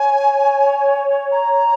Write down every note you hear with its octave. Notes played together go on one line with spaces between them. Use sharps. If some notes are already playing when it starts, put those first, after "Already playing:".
Already playing: C#5 G#5
A#5